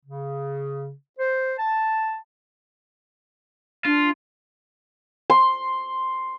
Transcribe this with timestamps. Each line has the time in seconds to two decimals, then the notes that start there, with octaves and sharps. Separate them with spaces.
0.06 C#3
1.19 C5
1.58 A5
3.85 D4 F4
5.30 C6